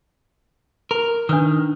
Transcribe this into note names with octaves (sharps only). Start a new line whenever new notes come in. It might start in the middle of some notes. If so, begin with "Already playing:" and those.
A#4
D#3 D4 B4 D#6